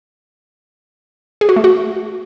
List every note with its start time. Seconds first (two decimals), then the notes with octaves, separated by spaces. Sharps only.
1.41 G#4
1.49 F#4
1.56 A3
1.64 F#4